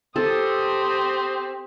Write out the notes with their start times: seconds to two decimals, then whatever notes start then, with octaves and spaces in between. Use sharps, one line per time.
0.16 C4 G4 A4 D#6